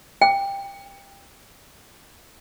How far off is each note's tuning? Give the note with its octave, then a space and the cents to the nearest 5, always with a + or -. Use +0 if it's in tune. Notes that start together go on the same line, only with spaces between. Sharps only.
G5 +15